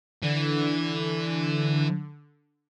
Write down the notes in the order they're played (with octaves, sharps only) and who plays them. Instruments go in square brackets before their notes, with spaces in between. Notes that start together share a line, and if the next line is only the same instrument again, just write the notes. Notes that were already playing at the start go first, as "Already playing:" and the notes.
[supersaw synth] D3 [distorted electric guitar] E3